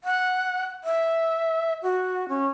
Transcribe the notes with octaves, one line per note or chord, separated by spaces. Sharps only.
F#5
E5
F#4
C#4